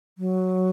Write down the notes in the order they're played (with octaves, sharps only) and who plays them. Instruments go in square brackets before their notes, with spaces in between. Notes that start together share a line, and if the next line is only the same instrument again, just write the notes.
[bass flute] F#3